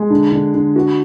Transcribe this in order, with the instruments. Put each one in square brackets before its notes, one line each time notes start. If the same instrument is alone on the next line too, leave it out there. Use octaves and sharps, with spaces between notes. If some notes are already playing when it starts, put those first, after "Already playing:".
Already playing: [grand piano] G#3
D3
D3
D3
F#4